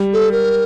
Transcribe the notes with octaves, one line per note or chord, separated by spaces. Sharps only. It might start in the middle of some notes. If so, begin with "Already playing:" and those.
Already playing: G3
A4
A#4